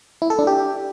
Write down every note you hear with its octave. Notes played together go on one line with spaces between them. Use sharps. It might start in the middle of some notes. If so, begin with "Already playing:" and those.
E4
A4
D4
G4